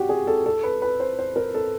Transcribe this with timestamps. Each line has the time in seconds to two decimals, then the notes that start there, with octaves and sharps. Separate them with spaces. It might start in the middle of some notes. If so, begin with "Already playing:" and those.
Already playing: F#4 G4
0.09 G#4
0.27 A4
0.46 A4
0.64 B4
0.82 B4
1.00 C5
1.19 C5
1.36 A#4
1.54 A4